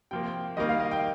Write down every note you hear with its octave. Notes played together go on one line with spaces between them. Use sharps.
C3 F3 A#3 G5
G5
D#3 G3 A#3 D#5
F5
D#5
G5